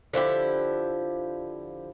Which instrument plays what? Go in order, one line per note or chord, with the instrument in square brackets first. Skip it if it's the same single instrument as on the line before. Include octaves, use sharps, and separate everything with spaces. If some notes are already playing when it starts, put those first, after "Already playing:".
[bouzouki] D3 F3 E4 G4